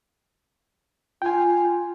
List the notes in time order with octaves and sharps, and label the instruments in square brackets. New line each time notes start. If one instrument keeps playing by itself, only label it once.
[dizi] F4 [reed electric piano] G5 G#5